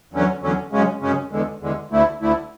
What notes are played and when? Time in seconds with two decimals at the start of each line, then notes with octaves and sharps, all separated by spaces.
0.13 E2 D3 F#3 C#4
0.42 E2 D3 F#3 C#4
0.72 F#2 C#3 G#3 C#4
1.01 F#2 C#3 G#3 C#4
1.31 E2 D3 G#3
1.61 E2 D3 G#3
1.91 D2 D3 A3 E4
2.20 D2 D3 A3 E4